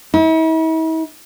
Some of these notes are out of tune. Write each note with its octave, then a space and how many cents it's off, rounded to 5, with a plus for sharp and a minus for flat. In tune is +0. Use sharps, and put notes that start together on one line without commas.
E4 -45